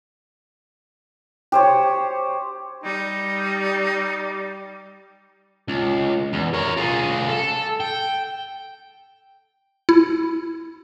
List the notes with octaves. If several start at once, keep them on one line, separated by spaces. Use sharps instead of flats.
G4 C5 C#5
G3 D#4
C#2
E2
A#4 C#5
F4 G#4
A4
G5
E4